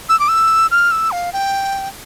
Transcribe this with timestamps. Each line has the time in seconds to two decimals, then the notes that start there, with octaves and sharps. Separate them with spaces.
0.09 E6
0.20 D6
0.28 E6
0.71 F6
0.91 E6
1.11 F5
1.33 G5